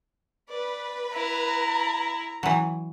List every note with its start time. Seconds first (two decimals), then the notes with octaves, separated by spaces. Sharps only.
0.49 B4 D5
1.14 E4 A#5
2.43 E3 F#3